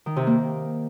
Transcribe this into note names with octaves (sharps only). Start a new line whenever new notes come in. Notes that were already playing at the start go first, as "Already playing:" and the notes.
D#3
C3
A#3